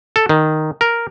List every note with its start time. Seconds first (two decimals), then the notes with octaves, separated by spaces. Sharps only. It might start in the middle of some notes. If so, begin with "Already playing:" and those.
0.16 A4
0.29 D#3
0.81 A#4